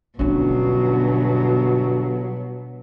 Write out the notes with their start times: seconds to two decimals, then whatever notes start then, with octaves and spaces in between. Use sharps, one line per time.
0.19 G1 B2 F#3 C#4 D4